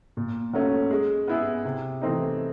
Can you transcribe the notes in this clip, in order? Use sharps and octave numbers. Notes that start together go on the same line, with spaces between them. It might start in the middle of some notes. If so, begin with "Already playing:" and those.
A#2
F#3 A3 C#4
G#3
B3 E4 G#4
C3
E3 A3 C4 D#4